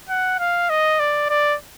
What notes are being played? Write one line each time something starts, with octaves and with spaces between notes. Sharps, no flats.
F#5
F5
D#5
D5
D5